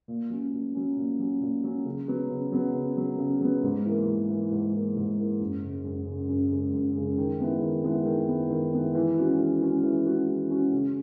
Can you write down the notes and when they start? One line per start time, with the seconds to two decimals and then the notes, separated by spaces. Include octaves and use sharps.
0.08 A#2
0.30 F#3 C#4
0.53 A#2
0.75 F#3 C#4
0.97 A#2
1.19 F#3 C#4
1.41 A#2
1.64 F#3 C#4
1.85 C#3
2.08 F#3 B3
2.30 C#3
2.52 F#3 B3
2.74 C#3
2.97 F#3 B3
3.18 C#3
3.41 F#3 B3
3.63 G#2
3.85 E3 A#3
4.07 G#2
4.29 E3 A#3
4.52 G#2
4.74 E3 A#3
4.96 G#2
5.18 E3 A#3
5.40 F#2
5.62 C#3 G#3
5.85 F#2
6.06 C#3 G#3
6.29 F#2
6.51 C#3 G#3
6.73 F#2
6.95 C#3 G#3
7.17 D#3
7.40 G#3 B3 E4
7.62 D#3
7.84 G#3 B3 E4
8.06 D#3
8.29 G#3 B3 E4
8.51 D#3
8.73 G#3 B3 E4
8.95 E3
9.17 G#3 C#4 F#4
9.39 E3
9.61 G#3 C#4 F#4
9.84 E3
10.06 G#3 C#4 F#4
10.28 E3
10.50 G#3 C#4 F#4
10.72 C#3